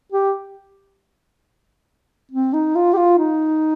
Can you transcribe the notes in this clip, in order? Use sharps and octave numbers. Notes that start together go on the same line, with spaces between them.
G4
C4
D#4
F4
G4
F4
D#4